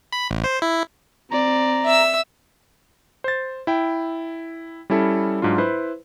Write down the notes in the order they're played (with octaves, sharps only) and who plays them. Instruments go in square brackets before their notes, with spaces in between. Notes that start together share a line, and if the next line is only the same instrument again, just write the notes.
[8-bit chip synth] B5
A1
C5
E4
[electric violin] C4 D5 [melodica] A#5
[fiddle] E5 E6
[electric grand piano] C5 A6
E4 G5
G3 C#4 E4 A4
G#2 F#3 D4 F4
E4 B4 C5